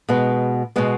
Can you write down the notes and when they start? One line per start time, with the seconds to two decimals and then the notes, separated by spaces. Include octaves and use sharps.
0.09 B2 G#3 B3
0.76 B2 G#3 B3